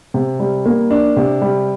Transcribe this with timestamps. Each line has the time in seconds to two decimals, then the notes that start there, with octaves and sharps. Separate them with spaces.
0.14 C3
0.39 G3
0.66 A#3
0.91 D4
1.16 C3
1.42 G3